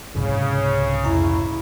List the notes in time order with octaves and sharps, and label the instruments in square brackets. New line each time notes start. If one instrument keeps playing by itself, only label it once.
[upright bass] C2 G#2 [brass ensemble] C#3
[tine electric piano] F2 A#5 C#6 [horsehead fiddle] E4